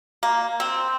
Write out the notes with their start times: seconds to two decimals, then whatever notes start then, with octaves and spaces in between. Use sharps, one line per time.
0.23 A#3
0.60 C4